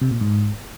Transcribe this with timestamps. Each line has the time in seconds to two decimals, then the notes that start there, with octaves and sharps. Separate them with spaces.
0.01 C3
0.11 A#2
0.21 G#2